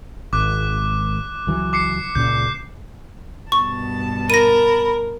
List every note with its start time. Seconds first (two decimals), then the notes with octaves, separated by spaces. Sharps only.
0.33 G#1 D6 F#6
1.47 C#2 E3 F#3
1.73 D6 C7 C#7
2.15 C#2 A#2 C#3 G6
3.52 G2 B2 A5 C#6
4.30 A#4 B5 A#6 D#7